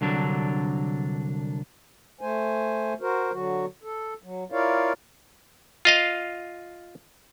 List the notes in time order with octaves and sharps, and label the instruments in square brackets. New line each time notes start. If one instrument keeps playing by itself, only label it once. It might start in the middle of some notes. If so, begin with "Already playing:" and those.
[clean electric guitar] C2 D3 F#3 D4
[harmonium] A3 C5 G#5
F#4 A#4 C5
D3 F#3 F#4
A4
F#3
E4 F4 A#4 C#5 D5 F5
[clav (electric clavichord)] F4 D#5 F5